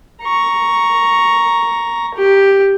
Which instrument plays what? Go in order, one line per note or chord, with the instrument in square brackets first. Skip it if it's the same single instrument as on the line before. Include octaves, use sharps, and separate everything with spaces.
[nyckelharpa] A#5 C#6
G4